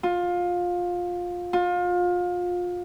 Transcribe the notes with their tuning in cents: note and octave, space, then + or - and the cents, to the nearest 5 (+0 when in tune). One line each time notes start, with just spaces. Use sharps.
F4 +20
F4 +30